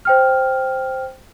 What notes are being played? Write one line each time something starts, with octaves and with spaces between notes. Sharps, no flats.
C5 G5 F6